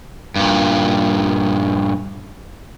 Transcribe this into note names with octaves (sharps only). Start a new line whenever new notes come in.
G2 A#2